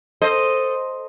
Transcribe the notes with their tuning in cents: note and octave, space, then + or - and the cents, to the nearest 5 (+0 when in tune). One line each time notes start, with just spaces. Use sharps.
A4 +10 C5 +0 D#5 +0